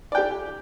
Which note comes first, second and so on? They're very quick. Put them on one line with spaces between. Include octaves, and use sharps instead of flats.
D5 G5 G4